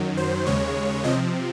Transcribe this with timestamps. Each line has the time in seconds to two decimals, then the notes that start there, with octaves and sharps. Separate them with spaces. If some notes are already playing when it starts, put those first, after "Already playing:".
Already playing: F#2 D#3 F#3
0.17 C5
0.46 D#2 C#3 G#3 C#5
1.04 C3 F3 C4 D#5